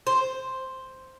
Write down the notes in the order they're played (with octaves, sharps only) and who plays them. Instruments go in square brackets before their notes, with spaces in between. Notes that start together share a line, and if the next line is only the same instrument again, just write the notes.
[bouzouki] C5